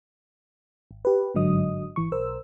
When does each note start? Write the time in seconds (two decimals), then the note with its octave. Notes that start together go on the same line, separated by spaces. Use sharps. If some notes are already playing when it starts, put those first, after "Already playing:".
0.91 G#1
1.05 G4 B4
1.35 G1 G#2 D3 F#3 D#5 D#6
1.96 G#1 E3 C#6
2.12 B1 A#4 C5 E6